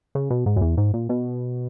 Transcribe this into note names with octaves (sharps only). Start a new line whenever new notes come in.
C#3
B2
G#2
F#2
E2
G#2
A#2
B2